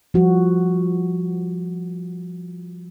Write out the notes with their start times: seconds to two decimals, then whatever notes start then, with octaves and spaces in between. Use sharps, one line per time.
0.14 F3 G3 F#4